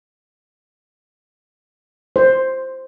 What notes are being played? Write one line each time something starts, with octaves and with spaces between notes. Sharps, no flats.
C5